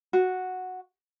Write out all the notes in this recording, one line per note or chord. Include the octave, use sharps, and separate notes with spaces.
F#4